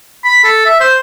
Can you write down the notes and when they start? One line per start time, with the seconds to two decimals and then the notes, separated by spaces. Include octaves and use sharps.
0.24 B5
0.44 A4
0.65 E5
0.80 C5